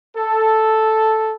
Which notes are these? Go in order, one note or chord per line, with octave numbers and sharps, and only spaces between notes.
A4